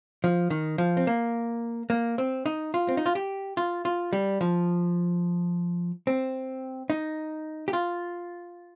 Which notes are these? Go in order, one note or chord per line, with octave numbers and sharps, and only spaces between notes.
F3
D#3
F3
C4
A#3
A#3
C4
D#4
F4
C4
D#4
F4
G4
F4
F4
G3
F3
C4
D#4
G4
F4